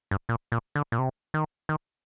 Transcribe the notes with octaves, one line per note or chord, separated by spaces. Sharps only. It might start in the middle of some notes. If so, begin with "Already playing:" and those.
G2
A#2
A#2
D3
A#2
C3
D#3
D#3